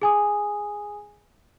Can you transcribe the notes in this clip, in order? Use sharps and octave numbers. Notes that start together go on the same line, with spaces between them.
G#4 G#5 D#6